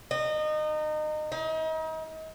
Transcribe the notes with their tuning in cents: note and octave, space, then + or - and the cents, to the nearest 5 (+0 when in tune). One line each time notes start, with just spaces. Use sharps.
D#4 -25
D#4 +35